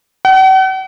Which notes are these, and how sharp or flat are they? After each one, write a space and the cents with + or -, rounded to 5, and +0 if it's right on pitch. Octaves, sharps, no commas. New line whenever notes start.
F#5 +45